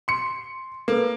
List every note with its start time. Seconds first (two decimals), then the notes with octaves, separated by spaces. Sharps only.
0.08 C6 C#7
0.88 A#3 A4 B4